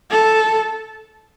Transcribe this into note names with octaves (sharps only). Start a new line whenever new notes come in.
A4